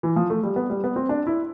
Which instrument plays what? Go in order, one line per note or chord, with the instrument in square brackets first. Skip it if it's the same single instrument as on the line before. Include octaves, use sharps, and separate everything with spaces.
[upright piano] E3
F3
A3
G3
B3
G3
B3
C4
D4
E4